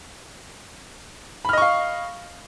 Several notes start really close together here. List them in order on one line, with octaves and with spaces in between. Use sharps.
B5 F6 D#5 C#6 F5